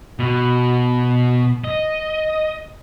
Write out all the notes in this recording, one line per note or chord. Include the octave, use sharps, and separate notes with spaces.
B2
D#5